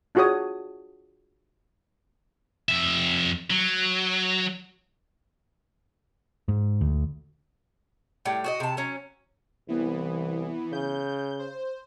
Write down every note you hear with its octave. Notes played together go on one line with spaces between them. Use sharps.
D4 F4 F#4 G#4 C#5 D#6
F2 E5
F#3
G#2
D2
A2 G3
F#4 G#4 D#5
C3 A5
F#3 C#4
C2 E3 B3
C#3 G6
C5